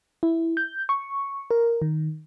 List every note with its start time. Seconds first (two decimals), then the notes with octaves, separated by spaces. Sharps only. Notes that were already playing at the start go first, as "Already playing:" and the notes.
0.23 E4
0.57 G6
0.89 C#6
1.51 A#4
1.82 D#3